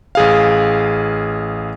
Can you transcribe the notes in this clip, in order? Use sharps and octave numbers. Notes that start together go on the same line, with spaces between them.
A1 G#4 F5